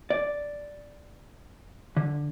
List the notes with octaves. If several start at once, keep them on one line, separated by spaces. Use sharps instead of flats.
D5
D3